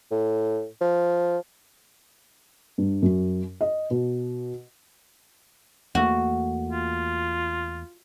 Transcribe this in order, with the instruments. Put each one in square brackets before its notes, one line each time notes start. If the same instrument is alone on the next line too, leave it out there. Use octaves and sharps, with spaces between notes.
[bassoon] A2
F3
[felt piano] G2
F#2
D#5
B2
[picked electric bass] E2 A3 A#3 [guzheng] F#4
[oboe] F4